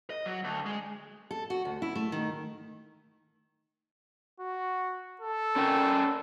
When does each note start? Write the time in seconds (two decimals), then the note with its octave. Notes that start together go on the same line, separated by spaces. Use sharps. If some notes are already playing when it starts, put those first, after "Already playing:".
0.10 D#5
0.26 F#3
0.44 D2
0.66 G#3
1.31 A4
1.50 F#4
1.65 D2
1.82 E4
1.95 A3
2.12 D#3
4.40 F#4
5.21 A4
5.56 C#4 A#4 G5